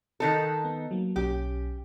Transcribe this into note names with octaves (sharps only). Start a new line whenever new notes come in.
D#3 D#4 A4 A#4 A5 F#6
B3
F#3 A#3
B1 C#4 G4